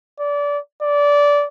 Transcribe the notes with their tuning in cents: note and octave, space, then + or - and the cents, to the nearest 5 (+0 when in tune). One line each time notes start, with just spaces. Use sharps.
D5 -25
D5 -20